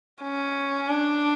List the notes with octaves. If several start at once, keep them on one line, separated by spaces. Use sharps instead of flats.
C#4
D4